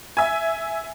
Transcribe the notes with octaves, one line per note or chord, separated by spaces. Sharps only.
E5 G#5